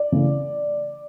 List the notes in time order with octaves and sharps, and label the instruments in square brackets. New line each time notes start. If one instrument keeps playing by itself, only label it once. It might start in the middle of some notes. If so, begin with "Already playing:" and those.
Already playing: [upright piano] D5
C#3 E3 A3